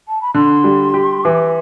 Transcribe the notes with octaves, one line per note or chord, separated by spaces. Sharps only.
A5
B5
D3 C6
G3
G4
E3 D6